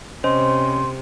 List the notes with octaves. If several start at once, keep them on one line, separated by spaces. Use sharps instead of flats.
C3 C#4 C5 D#5 C6